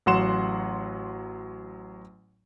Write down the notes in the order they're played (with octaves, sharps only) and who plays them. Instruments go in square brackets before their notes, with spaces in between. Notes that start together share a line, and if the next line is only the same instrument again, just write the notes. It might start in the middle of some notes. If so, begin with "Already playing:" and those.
[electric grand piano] A1 F#3 F#5 C6 E7